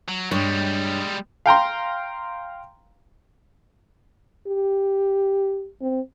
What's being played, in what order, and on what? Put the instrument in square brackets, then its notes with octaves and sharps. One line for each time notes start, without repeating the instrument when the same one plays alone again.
[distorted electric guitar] F#3
[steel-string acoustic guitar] G2 C#5 [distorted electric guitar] G3 G#3
[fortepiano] F5 G5 A#5 C6
[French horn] G4
C4